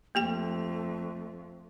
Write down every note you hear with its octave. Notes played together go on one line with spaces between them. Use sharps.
F2 A3 A#3 G4 G5